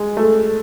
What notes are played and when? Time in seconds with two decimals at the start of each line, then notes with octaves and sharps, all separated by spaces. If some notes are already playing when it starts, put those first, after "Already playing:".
Already playing: G#3
0.17 A3